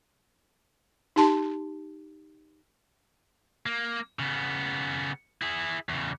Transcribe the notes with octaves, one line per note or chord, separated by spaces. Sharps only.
D#4 G4 A5 C6
A#3
C#3 B3
E4 G#4
E2 C#3